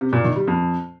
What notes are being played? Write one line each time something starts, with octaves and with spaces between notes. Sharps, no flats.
C3
A#2
D#3
G3
F2